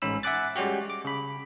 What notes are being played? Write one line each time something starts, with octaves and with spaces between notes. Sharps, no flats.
A1 G#2 C#4 B5 E6
E5 F#5 G#5 D6 F#6 A6
G3 G#3 C#4 F#4 G4
D6
C#3 B5